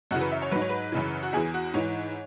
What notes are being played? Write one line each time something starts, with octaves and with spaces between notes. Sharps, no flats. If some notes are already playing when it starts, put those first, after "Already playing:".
F#2 C#3 E3 F#4
B4
E5
C#5
G#2 F#3 B4
C#5
B4
F#2 C#3 E3
F#4
E2 E3 G#4
F#4
G#2 E3 C#5